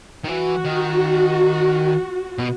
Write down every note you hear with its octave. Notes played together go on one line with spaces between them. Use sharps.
D#3
E3 F#4
D#3
B2